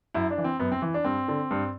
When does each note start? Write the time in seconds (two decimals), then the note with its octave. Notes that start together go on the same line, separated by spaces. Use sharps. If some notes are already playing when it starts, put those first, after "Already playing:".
0.14 F#2 E4
0.30 D4
0.38 E3
0.44 C4
0.59 F#2 B3
0.72 C4
0.82 E3
0.94 D4
1.04 G2 C4
1.28 D3
1.51 G2